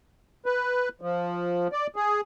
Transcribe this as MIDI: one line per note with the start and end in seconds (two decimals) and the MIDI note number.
0.46 0.89 71
1.01 1.68 53
1.72 1.87 74
1.96 2.21 68